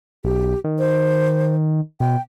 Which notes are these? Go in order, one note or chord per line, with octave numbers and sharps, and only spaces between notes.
B1 G4
D#3
C5
B2 G5